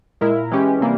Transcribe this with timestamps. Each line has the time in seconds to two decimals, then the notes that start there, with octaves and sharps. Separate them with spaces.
0.21 A#2 G#3 E4 A#4
0.51 E3 G#3 C#4 G4
0.81 C3 E3 G3 A#3